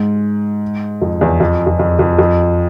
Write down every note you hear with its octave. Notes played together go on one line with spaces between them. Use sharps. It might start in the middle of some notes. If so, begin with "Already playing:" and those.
Already playing: G#2
F2
E2
F2
F2
F2
F2
F2